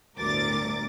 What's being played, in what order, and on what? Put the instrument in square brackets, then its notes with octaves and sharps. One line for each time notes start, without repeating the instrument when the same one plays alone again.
[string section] G1 D2 A2 A#4 D6 A6